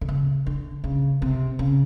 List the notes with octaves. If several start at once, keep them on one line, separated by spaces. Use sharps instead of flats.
D3
C#3
D3
C#3
C3
C#3